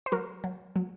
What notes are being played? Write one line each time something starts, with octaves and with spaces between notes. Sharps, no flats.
C5
F#3 F#4 A#4
F#3
F#3